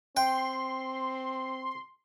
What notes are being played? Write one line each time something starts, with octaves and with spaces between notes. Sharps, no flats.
C4 G5 C6